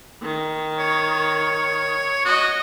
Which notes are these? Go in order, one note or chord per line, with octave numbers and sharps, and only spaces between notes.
D#3
C#5
F#4 D#5